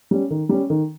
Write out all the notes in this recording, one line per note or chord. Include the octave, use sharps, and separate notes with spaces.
G3 C#4
D#3
G3 C#4
D#3